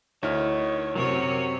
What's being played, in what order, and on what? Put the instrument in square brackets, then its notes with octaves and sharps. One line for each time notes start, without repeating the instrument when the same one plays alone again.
[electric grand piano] D2 E4 F6 [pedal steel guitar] D#4 [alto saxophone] C#5
[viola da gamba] F#2 C3 C#5 [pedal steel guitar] F#3 C4 C#6 [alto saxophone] A#4